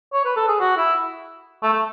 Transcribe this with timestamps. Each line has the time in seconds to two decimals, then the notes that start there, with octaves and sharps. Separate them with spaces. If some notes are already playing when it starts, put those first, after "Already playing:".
0.13 C#5
0.25 B4
0.36 A4
0.49 G#4
0.60 F#4
0.77 E4
1.63 A3
1.73 A3